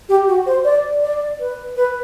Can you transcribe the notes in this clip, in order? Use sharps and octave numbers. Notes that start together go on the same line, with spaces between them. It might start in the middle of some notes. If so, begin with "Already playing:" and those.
G4
F#4
C5
D5
D5
B4
B4